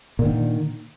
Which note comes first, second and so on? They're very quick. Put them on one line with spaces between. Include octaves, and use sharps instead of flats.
A#2 D3 D#3